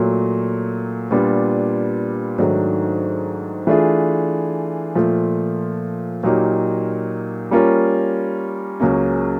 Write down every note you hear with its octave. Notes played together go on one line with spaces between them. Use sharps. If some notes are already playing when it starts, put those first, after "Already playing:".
Already playing: A#2 F#3 A3
A#2 G3 B3 D4 F4
G#2 D#3 F#3 A3 D4
E3 A3 D4 F4 G#4
A#2 F3 A3
A#2 F#3 A#3 D#4 G4
G3 A#3 C#4 F4 A#4
C#2 C#3 F#3 A#3 C#4